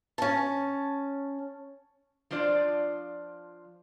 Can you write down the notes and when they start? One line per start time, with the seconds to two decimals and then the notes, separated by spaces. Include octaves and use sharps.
0.18 C#4 A5
2.31 F3 D4 F4 C5 D5